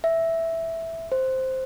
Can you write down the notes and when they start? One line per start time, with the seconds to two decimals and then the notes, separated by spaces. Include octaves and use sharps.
0.04 E5
1.12 C5